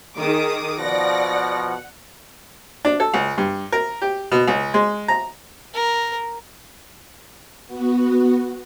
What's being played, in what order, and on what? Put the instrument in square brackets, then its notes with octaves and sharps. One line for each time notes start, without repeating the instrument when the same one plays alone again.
[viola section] D#3 G#4 [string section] D6 D#6
[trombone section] B2 F3 [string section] D5 A#6 [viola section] F#5
[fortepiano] D4
A4
C#2
G2
A#4
G4
B2
C#2
G#3
A#5
[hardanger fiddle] A#4
[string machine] B3 F#4